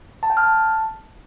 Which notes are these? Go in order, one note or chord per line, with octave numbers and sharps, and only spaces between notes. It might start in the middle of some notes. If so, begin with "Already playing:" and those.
A5
G5
F6
A5